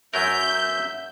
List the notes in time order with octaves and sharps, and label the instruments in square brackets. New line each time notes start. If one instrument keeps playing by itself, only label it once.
[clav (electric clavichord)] F#2 F#3 A#4 [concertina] E5 [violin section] G6